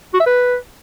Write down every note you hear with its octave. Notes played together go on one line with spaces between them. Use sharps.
F#4
E5
B4